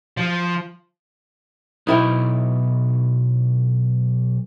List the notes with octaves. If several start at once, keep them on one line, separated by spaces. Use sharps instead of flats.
F3
B1 D#4 E4 G5